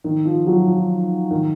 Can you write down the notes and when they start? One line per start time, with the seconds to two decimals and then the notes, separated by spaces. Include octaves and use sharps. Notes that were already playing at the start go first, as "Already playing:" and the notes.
0.04 D#3
0.25 F3
0.47 F#3
0.67 F3
1.31 D#3